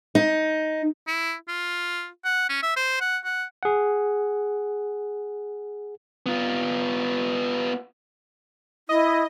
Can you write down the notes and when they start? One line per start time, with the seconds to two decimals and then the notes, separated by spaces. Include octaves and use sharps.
0.15 D#4
1.07 E4
1.48 F4
2.25 F#5
2.49 C#4
2.63 E5
2.76 C5
3.01 F#5
3.24 F#5
3.63 G#4 F#5
6.26 B3 F4
8.89 E4 D#5